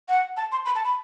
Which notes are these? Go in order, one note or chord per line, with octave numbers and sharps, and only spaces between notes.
F#5
A5
C6
B5
A5
B5